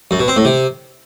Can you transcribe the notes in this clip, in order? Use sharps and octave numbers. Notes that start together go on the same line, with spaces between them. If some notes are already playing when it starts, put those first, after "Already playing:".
F#2
B2
C4
A2
C3